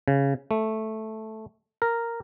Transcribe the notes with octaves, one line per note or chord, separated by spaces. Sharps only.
C#3
A3
A#4